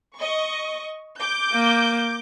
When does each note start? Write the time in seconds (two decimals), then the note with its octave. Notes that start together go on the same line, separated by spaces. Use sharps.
0.17 D#5 C#6
1.18 D6 G6
1.52 A#3